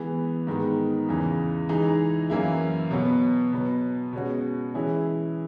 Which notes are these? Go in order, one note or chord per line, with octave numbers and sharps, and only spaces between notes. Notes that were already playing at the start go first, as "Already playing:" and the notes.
Already playing: E3 G#3 B3
G#2 D#3 G#3 B3
E2 C#3 E3
E3 G#3 D#4 G#4
F#2 E3 A#3 E4
B2 F#3 B3
B2 F#3 B3
B2 G#3 C#4 F#4
E3 G#3 C#4 E4 G#4